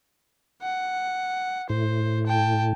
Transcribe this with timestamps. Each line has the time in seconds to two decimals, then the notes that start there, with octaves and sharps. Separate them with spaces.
0.62 F#5
1.70 A2 C5
2.27 G5 A5